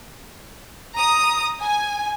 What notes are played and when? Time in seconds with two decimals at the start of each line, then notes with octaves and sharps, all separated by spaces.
0.94 A#5 D#6
1.61 G#5